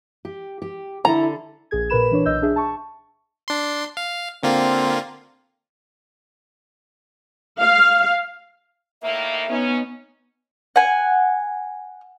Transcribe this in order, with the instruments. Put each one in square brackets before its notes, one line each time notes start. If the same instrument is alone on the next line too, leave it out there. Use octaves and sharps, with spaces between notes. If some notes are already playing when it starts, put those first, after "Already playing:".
[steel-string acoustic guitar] G4
G4
[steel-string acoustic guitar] D3 A4 [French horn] E4 [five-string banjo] A#5
[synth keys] A#1 G#4 G#6
A#2 A#4 B4 B5 E7
E3 D4 C#5
B1 D#5 E6 G6
D4 G#4 E5
A5 C#6
[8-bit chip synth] D4 C6
F5
[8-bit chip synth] D3 A#3 F4 [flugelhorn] C4
[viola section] F5
[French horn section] A2 D#3 A#3 [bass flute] E5
[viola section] B3 D#4 [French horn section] C#4
[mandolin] F#5 G#5